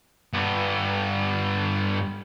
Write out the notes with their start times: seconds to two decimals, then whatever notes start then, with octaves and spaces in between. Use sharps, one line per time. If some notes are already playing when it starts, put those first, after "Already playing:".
0.33 G2 B3